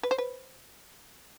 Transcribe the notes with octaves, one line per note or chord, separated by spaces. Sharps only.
B4
C5
B4